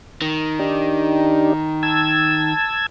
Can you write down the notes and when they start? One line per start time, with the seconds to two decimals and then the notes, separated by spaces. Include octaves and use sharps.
0.22 D#3
0.59 D4 D#4 G4
1.83 A5 E6 G#6